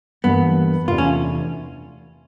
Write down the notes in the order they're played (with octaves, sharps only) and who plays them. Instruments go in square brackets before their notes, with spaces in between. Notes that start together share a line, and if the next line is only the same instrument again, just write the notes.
[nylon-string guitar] G2 E3 G3 A#3 D4 [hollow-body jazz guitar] B3
[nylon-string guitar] E2 C3 E3 A3 D4 [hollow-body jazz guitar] F4
[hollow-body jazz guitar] C#4